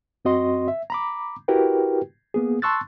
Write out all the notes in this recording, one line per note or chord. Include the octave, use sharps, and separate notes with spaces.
F#2 C4 F#4 D#5 C6
E5
A#5 B5 D6
E4 F#4 G4 A#4 B4 G5
A#3 B3 G#4
A5 C6 C#6 E6 F#6 A6